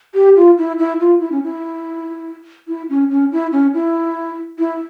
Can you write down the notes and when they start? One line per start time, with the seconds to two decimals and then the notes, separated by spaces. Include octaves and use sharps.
0.15 G4
0.36 F4
0.58 E4
0.79 E4
1.00 F4
1.20 E4
1.32 C#4
1.43 E4
2.68 E4
2.90 C#4
3.10 C#4
3.32 E4
3.52 C#4
3.74 E4
4.59 E4